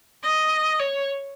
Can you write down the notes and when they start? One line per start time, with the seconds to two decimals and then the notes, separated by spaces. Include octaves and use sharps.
0.23 D#5
0.79 C#5